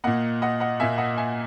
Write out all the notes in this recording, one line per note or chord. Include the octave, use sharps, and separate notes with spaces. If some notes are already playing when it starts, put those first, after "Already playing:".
A#2 A#3 D#5 F#5
D#5 F#5
D#5 F#5
A#2 A#3 E5 G#5
D#5 F#5
E5 G#5